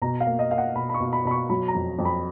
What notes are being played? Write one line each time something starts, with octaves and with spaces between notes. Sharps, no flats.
B2 A#5
F5
A#3
D#5
A#3 F5
F#5
B2 B5
B5
C#6
B2
B5
B2 B5
C#6
F#3 B5
A#5
F2
F2
B5